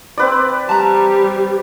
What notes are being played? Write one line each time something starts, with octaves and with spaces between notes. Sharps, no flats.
C4 B4 D5
G3 A5 A#5